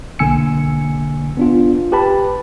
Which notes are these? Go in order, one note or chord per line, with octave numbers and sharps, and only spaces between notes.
B1 D3 A#3 G#5 E6 C#7
B3 D4 F4
G4 B4 A5 B5